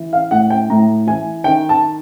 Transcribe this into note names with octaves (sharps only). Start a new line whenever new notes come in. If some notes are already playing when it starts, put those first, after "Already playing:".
Already playing: E3
F5
A2 F#5
G5
A2 A#5
E3 G#5
D#3 G5
A5